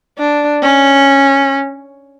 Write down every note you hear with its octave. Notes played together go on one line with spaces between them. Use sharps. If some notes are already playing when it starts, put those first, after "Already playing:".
D4
C#4